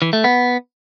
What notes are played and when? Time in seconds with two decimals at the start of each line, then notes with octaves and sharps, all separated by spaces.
0.02 E3
0.13 A3
0.24 B3